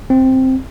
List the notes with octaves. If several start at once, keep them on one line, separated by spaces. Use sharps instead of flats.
C4